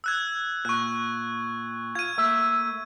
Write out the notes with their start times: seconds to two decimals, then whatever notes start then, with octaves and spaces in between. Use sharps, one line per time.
0.04 E6 F#6 G#6
0.65 A#2 C#6 F#6
1.95 F4 G#6 D#7
2.18 A3 A#3 E5